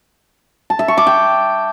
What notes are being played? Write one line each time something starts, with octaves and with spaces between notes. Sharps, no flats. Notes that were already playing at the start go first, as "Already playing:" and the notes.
A5
E5
C#6
D6
G5